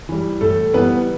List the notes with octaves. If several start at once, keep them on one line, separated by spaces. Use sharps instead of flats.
E3 G3
A2 A3 A4
E3 G3 B3 B4